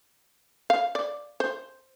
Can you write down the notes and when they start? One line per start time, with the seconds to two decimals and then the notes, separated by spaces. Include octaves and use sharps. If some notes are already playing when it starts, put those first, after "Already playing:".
0.70 F5
0.95 D5
1.40 C5